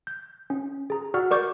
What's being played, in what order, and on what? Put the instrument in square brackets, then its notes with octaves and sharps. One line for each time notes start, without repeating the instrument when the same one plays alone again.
[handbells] G6
C#4
G#4 A#5
F#4 D5 F#5 E6 F6
A#4 D5 C#6 D6 G6